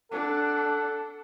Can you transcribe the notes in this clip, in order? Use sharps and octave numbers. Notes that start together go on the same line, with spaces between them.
D4 A4 F#5